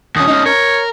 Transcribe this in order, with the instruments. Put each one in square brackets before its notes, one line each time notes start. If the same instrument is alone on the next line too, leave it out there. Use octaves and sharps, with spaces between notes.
[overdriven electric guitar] D#2 C#4 [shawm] D#6
[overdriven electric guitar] C#4 D#4
[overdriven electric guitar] A#4 [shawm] C#5